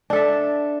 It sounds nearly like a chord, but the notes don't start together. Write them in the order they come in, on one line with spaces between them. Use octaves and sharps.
D4 A4 E5